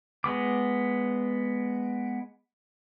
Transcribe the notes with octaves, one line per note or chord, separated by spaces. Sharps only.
G#3 B3 D6